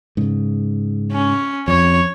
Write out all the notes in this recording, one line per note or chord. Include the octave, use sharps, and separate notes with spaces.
G#2 C#3
C#4
F2 C#5